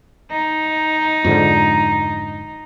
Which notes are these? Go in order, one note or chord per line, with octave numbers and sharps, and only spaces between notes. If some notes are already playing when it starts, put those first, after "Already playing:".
D#4
F2 G#2 D3